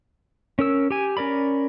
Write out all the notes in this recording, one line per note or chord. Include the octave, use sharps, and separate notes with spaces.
C#4 A#4 E6
G4 G#5
C#4 A#4 D5 B5